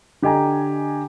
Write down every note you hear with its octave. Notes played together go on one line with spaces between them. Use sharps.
D3 G4 D#5 G#5 A#5